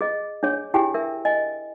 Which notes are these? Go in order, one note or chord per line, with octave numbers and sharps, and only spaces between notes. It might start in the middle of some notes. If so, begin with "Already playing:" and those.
G#4 D#5
D4 G#4 C#5
E4 G4 G#4 G5 G#5
A#4 E5
D#5 G#5